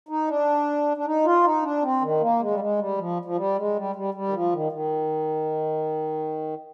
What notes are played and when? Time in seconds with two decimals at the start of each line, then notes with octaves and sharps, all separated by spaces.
0.09 D#4
0.28 D4
0.97 D4
1.05 D#4
1.25 F4
1.44 D#4
1.63 D4
1.83 C4
2.01 D#3
2.21 A#3
2.41 G#3
2.51 G3
2.59 G#3
2.79 G3
2.98 F3
3.25 F3
3.36 G3
3.57 G#3
3.76 G3
3.96 G3
4.14 G3
4.28 D#3
4.33 F3
4.52 D#3
4.72 D#3